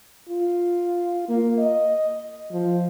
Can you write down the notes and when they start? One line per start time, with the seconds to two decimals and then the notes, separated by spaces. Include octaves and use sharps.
0.29 F4
1.28 A#3
1.58 D#5
2.52 F3